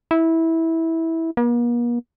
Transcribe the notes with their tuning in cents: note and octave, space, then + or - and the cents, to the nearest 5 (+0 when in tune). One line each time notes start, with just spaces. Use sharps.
E4 -15
A#3 +45